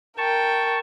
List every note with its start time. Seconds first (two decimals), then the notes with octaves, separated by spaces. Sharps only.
0.18 A#4 G5 A5 C#6